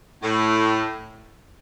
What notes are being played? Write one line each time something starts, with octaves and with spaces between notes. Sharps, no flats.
A2